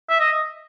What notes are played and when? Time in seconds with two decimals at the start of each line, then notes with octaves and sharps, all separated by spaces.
0.10 E5
0.20 D#5